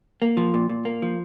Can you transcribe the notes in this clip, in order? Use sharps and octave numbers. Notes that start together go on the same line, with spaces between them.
A#3
F3
A#2
A#2
A#3
F3